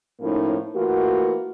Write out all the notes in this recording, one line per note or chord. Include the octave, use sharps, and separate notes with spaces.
A2 F3 A#3 C#4 D#4 E4
E3 A3 A#3 F4 F#4